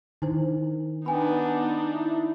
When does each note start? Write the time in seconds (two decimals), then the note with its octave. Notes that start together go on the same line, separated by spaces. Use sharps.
0.22 D#3 D4 E4 C5
1.06 B3 D4 D#4 G5 G#5 B5
1.94 E4